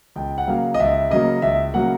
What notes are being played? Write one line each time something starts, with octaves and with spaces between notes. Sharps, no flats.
C#2 G5
F#5
C#3 F#3 A#3 F5
D#5
C#2 E5
C#3 F#3 A#3 D#5
C#2 E5
C#3 F#3 A#3 F#5